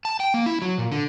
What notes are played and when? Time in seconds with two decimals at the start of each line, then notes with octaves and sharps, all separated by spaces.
0.05 A5
0.20 G5
0.34 A#3
0.46 E4
0.62 F#3
0.78 A#2
0.92 D3